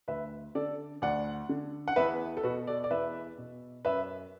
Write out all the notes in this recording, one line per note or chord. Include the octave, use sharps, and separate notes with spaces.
D2 B4 E5
D3 A4 D5
D2 D5 F#5
D3
F#5
E2 B4 E5
A4
B2 F#4 B4
A4 D5
D5
E2 B4 E5
B2
F#2 B4 E5